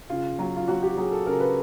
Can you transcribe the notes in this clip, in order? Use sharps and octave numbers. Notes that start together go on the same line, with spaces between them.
C#3 F4
F#3
F4
F#3 F#4
G4
F#3 G#4
A4
C#3 A#4
B4